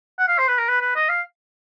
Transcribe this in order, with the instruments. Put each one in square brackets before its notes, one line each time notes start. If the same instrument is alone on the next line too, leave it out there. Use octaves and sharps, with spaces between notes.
[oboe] F#5
F5
C5
B4
A#4
B4
B4
D#5
F5